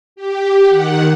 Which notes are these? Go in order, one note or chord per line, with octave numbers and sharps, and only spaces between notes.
G4
D#3 F#5